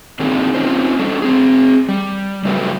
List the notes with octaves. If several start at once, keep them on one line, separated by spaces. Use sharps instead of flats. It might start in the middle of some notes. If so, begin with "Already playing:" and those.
A#2 D#3 C4 D4 D#4 G#4
C4 C#4 D#4 F4 C5
G3 C#4 D4 A4
C4 G#4
G3
C#3 F#3 G3 A3 G4 B4